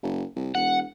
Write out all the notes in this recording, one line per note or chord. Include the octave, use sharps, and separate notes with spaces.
F#1
C2
E1 F#5